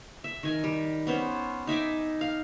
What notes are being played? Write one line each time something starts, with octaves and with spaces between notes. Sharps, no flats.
E5
D#3 G#5
G3
B3 C#4 C5
D#4 E5 G#5 D6
F5